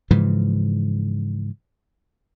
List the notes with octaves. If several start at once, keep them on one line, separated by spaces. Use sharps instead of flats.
G#2 C#3 E3 F3